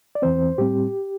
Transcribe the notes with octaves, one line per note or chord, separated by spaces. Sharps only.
D5
E2 E3 C4 C5
A2 G3 C4 G4